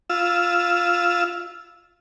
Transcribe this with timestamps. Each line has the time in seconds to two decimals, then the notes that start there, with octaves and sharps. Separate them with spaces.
0.10 F4 E6